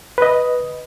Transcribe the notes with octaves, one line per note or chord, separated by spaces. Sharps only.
B4 D#5